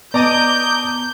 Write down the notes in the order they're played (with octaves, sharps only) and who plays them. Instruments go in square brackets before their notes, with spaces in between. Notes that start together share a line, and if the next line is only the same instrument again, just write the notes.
[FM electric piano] B3 [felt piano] D5 D#5 A5 [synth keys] A#5 D6 D#6 [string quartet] G6